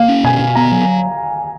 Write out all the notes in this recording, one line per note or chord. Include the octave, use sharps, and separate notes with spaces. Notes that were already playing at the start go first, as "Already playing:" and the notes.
Already playing: A#3 F5
C#4
B2 G#5
B2
B3 A#5
F#3